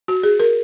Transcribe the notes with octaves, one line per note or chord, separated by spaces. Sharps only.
F#4
G#4
A#4